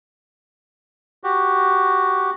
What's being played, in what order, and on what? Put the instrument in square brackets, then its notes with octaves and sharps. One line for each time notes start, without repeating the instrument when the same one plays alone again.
[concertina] F#4 G4